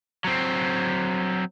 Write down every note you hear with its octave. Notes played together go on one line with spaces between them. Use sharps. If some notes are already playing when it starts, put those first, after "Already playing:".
F#3 C4